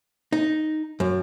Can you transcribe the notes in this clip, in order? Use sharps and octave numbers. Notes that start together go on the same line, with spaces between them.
D#4
F#2